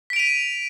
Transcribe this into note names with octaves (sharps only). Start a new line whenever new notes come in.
B6 D7 D#7 F7